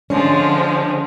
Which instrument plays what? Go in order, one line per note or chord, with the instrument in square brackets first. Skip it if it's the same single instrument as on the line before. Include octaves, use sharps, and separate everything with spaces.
[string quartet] D3 F3 G#3 [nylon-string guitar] C#4 D4